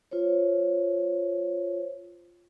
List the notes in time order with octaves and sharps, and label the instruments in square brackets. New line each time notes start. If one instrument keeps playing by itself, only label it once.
[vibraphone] F4 C5 C#5